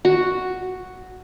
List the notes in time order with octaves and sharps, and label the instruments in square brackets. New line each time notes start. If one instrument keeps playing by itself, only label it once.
[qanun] F#4